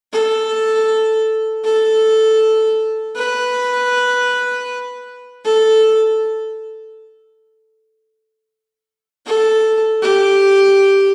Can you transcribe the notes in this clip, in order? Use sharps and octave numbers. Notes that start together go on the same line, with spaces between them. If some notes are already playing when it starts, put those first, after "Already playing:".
A4
A4
B4
A4
A4
G4